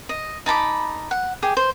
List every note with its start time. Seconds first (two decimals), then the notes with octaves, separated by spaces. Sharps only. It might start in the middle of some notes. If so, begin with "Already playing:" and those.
0.09 D#5
0.46 D#4 A5 B5 D6
1.11 F#5
1.43 G4 G#4
1.57 C5